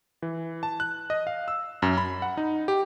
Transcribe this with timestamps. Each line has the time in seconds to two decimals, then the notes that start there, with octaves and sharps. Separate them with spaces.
0.22 E3
0.63 A5
0.80 F#6
1.10 D#5
1.27 F5
1.48 E6
1.82 F#2
1.97 B5
2.22 F#5
2.37 D#4
2.68 G4